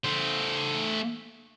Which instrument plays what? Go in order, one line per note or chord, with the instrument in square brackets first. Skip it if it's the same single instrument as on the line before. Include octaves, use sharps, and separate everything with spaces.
[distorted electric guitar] A3 C5